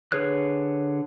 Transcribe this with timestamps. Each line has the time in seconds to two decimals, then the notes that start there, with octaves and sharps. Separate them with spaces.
0.12 D3 G#4 B4 C#5 F#6